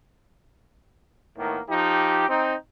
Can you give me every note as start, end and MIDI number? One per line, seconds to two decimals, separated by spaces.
1.37 1.59 45
1.37 1.59 51
1.37 1.59 58
1.37 1.59 59
1.69 2.27 53
1.69 2.27 63
1.69 2.27 67
2.29 2.54 60
2.29 2.54 63